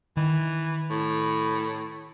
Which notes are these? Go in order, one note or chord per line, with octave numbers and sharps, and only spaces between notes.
D#3 E3
A2